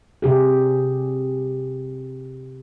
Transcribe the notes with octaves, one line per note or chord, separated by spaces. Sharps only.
C3 G4 G#4